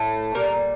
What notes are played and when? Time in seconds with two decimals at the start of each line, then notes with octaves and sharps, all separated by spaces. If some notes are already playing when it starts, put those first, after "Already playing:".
Already playing: A2 A3
0.35 A#2 G3 A#4